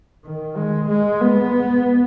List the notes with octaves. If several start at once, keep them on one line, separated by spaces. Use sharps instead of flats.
D#3
G#3
G#3
B3